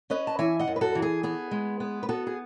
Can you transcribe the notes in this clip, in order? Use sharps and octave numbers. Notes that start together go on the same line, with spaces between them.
C#4 B4 D#5
A5
E3 E5 G#5
D#5 F#5
F#2
B4
F#4 A4
E3
G#4
B3 G#4
G#3
B3
B4
B3 F#4 A4
G#4